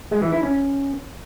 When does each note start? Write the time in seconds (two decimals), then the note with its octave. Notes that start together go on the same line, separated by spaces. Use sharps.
0.11 G#3
0.22 E3
0.32 E4
0.43 C#4